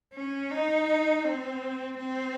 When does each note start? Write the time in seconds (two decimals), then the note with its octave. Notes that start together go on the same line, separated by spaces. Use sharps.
0.14 C#4
0.51 D#4
1.25 C4
1.98 C4